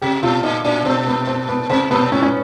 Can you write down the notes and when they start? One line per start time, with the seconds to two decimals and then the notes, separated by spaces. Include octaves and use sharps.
0.02 C3 G4
0.23 B2 F4
0.43 A#2 D#4
0.65 A#2 D4
0.85 B2 C4
1.07 B3
1.27 C4
1.49 B3
1.70 C3 C4
1.91 B2 B3
2.12 A2 C#4
2.23 C#4